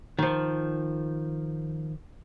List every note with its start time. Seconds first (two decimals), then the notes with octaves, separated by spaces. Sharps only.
0.19 D#3 F3